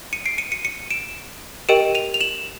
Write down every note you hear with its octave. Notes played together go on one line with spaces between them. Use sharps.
C#7 D#7
C7 D7
C#7 D#7
C#7 D#7
C#7 D#7
D7 E7
G4 A#4 D#5 G5 D7 E7
D#7 F7
F7
E7 F#7